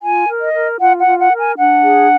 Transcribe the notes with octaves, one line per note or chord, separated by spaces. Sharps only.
F4 G#5
A#4
D#5
A#4
F4 F#5
F#5
F4
F#5
A#4
G#5
D4 F#5
G#4